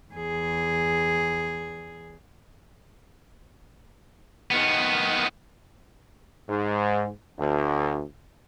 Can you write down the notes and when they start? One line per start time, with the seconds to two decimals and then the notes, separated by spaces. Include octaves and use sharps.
0.13 E2 G#4
4.51 D#3 B3
6.49 G#2
7.38 D2